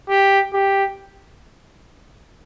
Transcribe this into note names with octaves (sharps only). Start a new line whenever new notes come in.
G4
G4